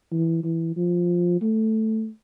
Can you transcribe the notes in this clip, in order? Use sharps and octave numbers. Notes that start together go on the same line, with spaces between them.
E3
E3
F3
A3